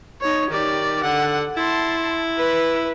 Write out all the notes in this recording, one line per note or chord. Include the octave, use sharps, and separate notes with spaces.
D#4 C#5
D#3 G4 D5
D3 F#5
E4 A5 C6
B4